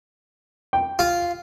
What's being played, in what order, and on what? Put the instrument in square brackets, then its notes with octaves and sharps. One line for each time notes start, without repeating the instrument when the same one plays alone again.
[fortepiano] G5
[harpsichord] F4